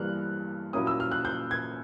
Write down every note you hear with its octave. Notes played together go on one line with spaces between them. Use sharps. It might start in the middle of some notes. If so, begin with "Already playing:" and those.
Already playing: G2 E3 G3 A#3 F6 F#6
A#2 F#3 A#3 C#4 E4 D#6
E6
F6
F#6
G6
G#6